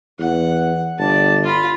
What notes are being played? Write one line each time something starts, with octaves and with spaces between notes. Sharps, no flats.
E2 F#5
G1 D5 A5
F4 B5